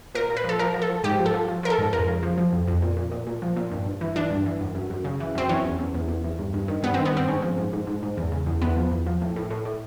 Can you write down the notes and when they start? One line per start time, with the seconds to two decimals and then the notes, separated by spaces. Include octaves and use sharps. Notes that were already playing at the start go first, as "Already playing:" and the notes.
0.15 A#2 A#4
0.30 A#2
0.37 B4
0.44 F3 A4
0.59 F3 A#4
0.74 F3
0.82 A4
0.89 F3
1.04 G#2 G4
1.19 F3
1.26 A4
1.34 F3
1.48 F3
1.63 F3 A#4
1.70 A4
1.78 G#2
1.93 F2 A#4
2.08 C#3
2.23 F3
2.37 F3
2.53 F2
2.68 F2
2.82 A#2
2.97 A#2
3.12 A#2
3.27 A#2
3.42 F3
3.56 A#2
3.71 G2
3.86 G2
4.01 E3
4.16 E3 D4
4.30 G2
4.46 E3
4.61 F#2
4.75 F#2
4.90 F#2
5.04 C#3
5.20 E3
5.35 F#2 C4
5.49 E3 C#4
5.65 E2
5.79 E2
5.94 E2
6.08 E2
6.24 E2
6.39 G2
6.54 G2
6.68 D#3
6.83 G2 B3
6.94 D#3 C4
7.05 B3
7.13 G2 C4
7.28 G#2 C#4
7.42 F3
7.58 G#2
7.73 G#2
7.87 G#2
8.03 G#2
8.17 E2
8.32 C#3
8.46 E2
8.62 E2 B3
8.76 F3
8.91 E2
9.06 F3
9.21 A2
9.36 A2
9.50 A2
9.65 A2